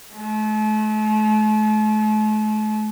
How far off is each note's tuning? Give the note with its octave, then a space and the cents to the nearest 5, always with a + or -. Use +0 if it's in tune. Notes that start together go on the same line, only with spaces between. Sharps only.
A3 -40